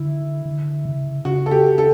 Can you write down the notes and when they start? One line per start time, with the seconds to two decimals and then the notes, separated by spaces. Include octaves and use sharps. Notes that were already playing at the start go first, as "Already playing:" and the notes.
Already playing: D3 E4
0.46 D3
0.85 C#3
1.25 C#3 F#4
1.46 A4
1.51 G4
1.78 A4